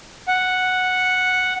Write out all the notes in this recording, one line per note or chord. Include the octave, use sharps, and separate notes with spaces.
F#5